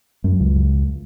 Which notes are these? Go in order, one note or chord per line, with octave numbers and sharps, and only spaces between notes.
F#2
C#2